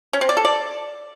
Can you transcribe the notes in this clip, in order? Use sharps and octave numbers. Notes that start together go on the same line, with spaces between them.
C#4
C4
D5
A4
D5